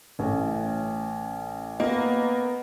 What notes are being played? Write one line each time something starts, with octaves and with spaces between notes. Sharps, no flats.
A1 A3 C#4
A#3 B3 D#5